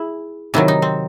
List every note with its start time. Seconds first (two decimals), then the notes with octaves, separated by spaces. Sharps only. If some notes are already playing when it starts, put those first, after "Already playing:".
Already playing: E4 G#4
0.54 C3 D#3 F#3 E4
0.68 D#4
0.82 C4